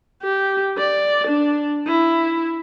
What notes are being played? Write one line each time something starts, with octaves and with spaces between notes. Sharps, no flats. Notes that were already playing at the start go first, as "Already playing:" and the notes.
G4
D5
D4
E4